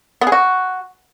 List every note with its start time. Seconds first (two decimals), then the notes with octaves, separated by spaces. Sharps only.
0.21 B3
0.27 G#4
0.32 F#4